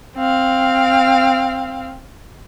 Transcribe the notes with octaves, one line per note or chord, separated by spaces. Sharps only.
C4 F5